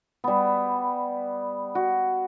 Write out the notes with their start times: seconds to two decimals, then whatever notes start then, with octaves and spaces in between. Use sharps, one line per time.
0.24 G3 B3
1.75 F#4